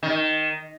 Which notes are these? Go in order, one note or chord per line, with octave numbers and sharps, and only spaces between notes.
D#3